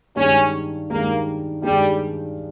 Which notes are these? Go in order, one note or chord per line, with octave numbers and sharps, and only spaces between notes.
G2 D#3 G#3 C#4
G2 D#3 G#3 A#3
G2 D#3 G3 G#3